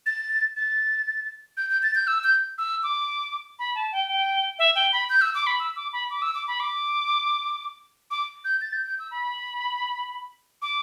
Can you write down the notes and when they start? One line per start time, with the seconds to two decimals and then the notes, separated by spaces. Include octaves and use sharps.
0.06 A6
0.56 A6
1.57 G6
1.70 G6
1.83 A6
1.95 G6
2.07 E6
2.24 G6
2.58 E6
2.83 D6
3.59 B5
3.75 A5
3.92 G5
4.09 G5
4.59 E5
4.75 G5
4.92 B5
5.10 G6
5.21 E6
5.34 D6
5.47 B5
5.59 E6
5.76 D6
5.93 B5
6.10 D6
6.22 E6
6.35 D6
6.48 B5
6.60 D6
8.11 D6
8.45 G6
8.61 A6
8.73 G6
8.86 G6
8.99 E6
9.11 B5
10.62 D6